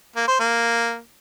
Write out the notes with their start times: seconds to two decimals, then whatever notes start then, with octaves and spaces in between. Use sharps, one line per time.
0.16 A#3
0.28 C5
0.40 A#3